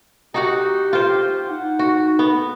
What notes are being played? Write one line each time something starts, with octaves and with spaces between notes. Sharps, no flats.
D#4 F#4 G4 F#5
F4 C5
D#4 F#5
F#4
B3